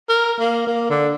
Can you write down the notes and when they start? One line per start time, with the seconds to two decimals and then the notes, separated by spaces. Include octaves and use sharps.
0.09 A#4
0.39 A#3
0.67 A#3
0.90 D3